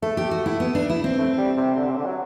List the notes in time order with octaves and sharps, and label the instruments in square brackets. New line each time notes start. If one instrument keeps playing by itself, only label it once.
[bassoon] A3 [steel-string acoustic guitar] A4
[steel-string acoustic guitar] G4
F#4
E4
B3
D4
E4
C4
[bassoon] A3
G3
C3
D3
C3
D3
F#3